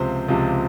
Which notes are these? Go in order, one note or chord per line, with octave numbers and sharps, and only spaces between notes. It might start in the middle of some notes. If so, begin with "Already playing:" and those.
Already playing: C#2 C3 F3 C5
C#2 C3 F3